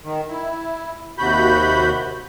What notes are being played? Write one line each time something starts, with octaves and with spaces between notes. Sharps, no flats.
D#3
E4
D#2 C3 F#4 B5 G6